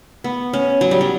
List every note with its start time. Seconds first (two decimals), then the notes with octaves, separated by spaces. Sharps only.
0.24 B3
0.53 C#4
0.81 F#3
0.91 G3
1.01 F#3